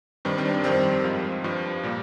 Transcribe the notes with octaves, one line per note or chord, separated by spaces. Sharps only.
G2 D#3 G3 C4
C4
D4
C4
F2 D#3 G3 C4
G#2 F3
G2 F3
A#2 G3